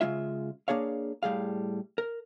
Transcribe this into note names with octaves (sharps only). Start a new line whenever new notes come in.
C#3 G#3 F4 E5
A#3 D4 G#4 C#5 F5
A2 G3 G#4 F5
A#4